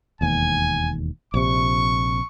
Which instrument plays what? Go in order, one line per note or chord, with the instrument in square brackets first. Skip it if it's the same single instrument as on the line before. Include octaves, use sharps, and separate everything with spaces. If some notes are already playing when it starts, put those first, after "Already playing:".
[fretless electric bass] E1 D#2 [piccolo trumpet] G#5
[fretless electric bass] A#1 C3 [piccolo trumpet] C#6